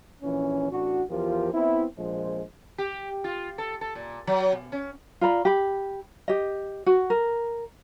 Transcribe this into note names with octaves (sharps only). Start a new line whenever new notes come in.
A#1 E3 C#4
A1 D4 F#4
E2 F3 F4 G4 A#4
B3 C4 E4
A#1 F3 G#3 C5
G4
F4
A4
A4
A#2
F#3
B2
C#4
F4 D5 A#5 B5
G4 B5
G4 D#5
F#4
A#4